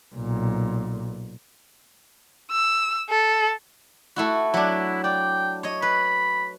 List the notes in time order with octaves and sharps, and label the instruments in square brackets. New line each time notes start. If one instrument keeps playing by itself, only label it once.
[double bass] B1 A#2
[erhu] E6
A4
[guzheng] A3 E4 F#4
[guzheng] F#3 D4 [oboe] E4
[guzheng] D5 [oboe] G5
[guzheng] C#5 D#5
[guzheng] B4 [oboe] B5